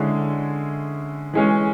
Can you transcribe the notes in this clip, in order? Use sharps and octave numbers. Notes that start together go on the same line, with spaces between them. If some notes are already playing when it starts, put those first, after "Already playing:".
Already playing: D3 G#3 C#4 E4 G#4
E3 G#3 C#4